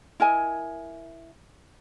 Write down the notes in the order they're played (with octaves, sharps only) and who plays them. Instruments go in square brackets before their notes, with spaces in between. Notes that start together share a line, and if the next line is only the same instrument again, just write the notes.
[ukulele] E4 A#4 D#5 G#5